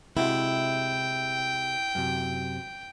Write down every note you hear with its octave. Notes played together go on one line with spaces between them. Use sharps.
C3 G#3 E4 F#4 G5
F#2 C3